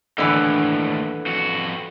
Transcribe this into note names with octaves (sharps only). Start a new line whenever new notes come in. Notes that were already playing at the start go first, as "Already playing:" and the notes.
D#2 A2 D3 E3
F2 F#4